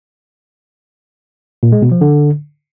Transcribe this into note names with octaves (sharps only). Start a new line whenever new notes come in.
A#2
G#3
B2
F3
D3